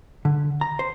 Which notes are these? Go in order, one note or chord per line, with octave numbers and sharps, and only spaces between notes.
D3
A#5
C5